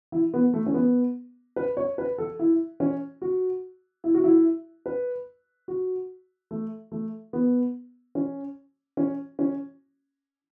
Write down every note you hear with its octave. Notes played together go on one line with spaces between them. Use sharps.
E4
B3
A3
C#4
B3
B4
C#5
B4
A4
E4
C#4
F#4
E4
F#4
E4
B4
F#4
A3
A3
B3
C#4
C#4
C#4